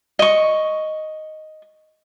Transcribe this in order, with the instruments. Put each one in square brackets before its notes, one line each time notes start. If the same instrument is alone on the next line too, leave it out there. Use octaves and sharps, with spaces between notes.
[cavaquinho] D#5 C#6